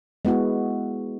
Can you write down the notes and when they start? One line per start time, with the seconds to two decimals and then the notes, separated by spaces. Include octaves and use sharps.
0.25 G#3 B3 E4 F#4